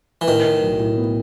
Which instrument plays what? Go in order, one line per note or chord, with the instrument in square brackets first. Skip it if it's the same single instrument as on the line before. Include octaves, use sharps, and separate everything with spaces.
[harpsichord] E3
[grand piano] A2 [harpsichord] D#3
[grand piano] A2
B1
A2
B3